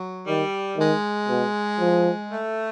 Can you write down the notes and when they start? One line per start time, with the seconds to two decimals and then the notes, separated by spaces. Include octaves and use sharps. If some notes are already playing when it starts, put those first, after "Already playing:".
Already playing: F#3
0.27 D#3 G3
0.78 D#3 G#3
1.29 B2
1.80 F3
2.30 A3